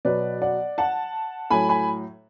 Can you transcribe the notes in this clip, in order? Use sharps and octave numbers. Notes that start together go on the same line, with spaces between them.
B2 F#3 B4 D5
D5 F#5
F#5 A5
A2 F#3 G#5 B5
G#5 B5